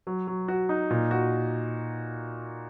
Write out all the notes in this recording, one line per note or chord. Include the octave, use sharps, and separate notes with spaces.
F#3
F#3
F#4
D#4
A#2
F#4